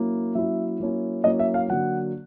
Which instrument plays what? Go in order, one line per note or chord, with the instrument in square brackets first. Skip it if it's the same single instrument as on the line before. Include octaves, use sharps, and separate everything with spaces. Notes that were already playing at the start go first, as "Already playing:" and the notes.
Already playing: [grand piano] F#3 A#3 C#4 E4
F#3 A#3 C#4 E4 E5
F#3 A#3 C#4 E4
F#3 A#3 C#4 E4 D#5
E5
F5
D3 F#3 A#3 F#5